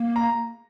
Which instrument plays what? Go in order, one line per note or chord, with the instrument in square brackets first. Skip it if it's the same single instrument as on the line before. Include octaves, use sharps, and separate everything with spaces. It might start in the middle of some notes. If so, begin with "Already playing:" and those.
Already playing: [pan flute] A#3
[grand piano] A#5